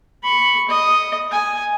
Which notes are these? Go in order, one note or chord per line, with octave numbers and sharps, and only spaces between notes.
B5 C#6
D#5
G#5